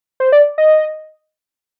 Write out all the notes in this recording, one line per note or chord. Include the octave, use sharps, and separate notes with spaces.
C5
D5
D#5